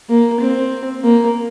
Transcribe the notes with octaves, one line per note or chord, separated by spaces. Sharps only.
A#3
C4
A#3